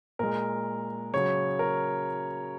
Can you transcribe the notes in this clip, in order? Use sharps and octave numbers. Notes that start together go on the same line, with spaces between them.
A#2 G#3 A#4
C#3 F#3 C#5
A#4